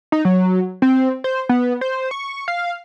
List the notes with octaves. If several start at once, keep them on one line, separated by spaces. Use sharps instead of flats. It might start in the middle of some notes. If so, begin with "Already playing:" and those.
D#4
F#3
C4
C5
B3
C5
C#6
F5